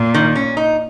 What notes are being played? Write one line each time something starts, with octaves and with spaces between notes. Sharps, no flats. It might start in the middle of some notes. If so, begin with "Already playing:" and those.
Already playing: A#2
D#3
C#4
D#4